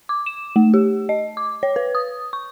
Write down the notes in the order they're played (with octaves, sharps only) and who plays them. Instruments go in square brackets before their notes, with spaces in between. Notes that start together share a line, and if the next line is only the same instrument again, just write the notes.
[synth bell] D6
E7
A3
G4
D#5
D6
C#5
B4
D#6
C#6